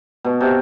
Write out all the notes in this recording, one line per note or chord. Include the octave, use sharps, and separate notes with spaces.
B2
C3